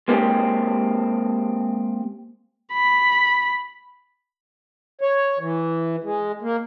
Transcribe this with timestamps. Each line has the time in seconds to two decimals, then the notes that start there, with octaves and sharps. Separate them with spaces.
0.08 G#3 A#3 C4 G4 G#4
2.73 B5
5.01 C#5
5.39 E3
6.03 G#3
6.42 A#3